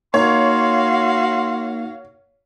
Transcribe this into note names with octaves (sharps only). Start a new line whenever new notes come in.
A#3 D#4 F#4 C#5 F5 C6